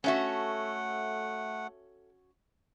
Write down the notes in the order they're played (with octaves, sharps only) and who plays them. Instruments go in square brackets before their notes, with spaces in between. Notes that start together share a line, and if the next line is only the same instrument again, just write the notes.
[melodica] A3 F#5 [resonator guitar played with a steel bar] C#4 F#4 [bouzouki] A4 E5 A5